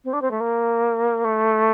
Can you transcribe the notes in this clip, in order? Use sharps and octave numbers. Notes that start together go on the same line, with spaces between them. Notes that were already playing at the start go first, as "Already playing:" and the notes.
C4
D4
C4
A3
A#3
A3